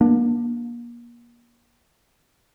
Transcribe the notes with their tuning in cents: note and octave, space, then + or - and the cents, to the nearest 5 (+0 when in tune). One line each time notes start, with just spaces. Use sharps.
A#3 +35 D4 +15